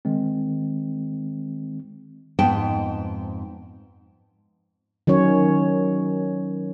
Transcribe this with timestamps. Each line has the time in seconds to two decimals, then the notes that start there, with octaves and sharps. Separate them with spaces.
0.05 D#3 G#3 C4
2.39 F2 G#2 B3 D#4 G5 A5
5.07 D#3 F#3 C#4 C#5